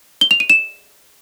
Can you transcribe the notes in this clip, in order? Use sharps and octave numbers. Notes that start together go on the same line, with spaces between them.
G7
F7
D#7
E7